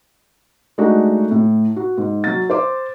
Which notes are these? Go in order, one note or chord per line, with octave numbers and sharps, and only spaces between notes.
G#3 A3 D4 D#4 F#4
A2
F#4
G#2
F#3 A6
C5 D6